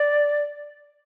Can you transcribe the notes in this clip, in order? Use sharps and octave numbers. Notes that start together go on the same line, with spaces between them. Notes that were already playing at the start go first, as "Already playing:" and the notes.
Already playing: D5